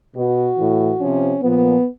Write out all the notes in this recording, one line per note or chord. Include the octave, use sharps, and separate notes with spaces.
B2 F#4
A2 E3
C3 F3 C#4
A#2 F3 B3